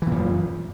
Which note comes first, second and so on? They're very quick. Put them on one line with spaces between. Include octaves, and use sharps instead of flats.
E3 A#2 F#2 F3